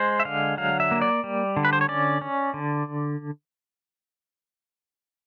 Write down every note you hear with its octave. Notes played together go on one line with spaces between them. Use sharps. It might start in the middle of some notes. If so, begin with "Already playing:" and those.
Already playing: G#3 C5
E5
D3 F5
F#3 F5
E5
A#3
D5
G3
D3
B4
C5
C#5
C#4 D5
C#4
D3